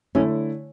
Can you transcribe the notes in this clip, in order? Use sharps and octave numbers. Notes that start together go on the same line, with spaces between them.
D3 A3 C#4 E4